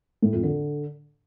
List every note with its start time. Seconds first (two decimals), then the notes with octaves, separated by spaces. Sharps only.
0.22 A2
0.33 F2
0.43 D3